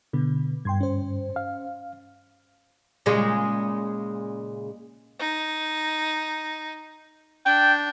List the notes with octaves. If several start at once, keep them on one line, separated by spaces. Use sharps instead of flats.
B2 D3 B3
G2 G5 C6 G#6
C#4 C5
F5
A#2 C#3 G#3
D#4
D4 G5